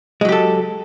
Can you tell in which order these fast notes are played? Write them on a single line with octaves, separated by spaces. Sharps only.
G#3 F#3 G4 A4